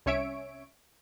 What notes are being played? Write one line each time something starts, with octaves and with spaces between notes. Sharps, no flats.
C2 C#4 C#5 E5 D7